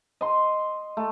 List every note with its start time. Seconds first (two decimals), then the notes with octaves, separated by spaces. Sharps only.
0.21 D#5 C6
0.97 A3